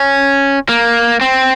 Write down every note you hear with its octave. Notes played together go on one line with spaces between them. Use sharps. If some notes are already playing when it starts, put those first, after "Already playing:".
Already playing: C#4
A#3
C4